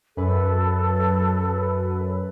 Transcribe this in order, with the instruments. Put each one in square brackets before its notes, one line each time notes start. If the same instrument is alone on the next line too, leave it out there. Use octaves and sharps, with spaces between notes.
[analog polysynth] F#2 B4 [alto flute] A4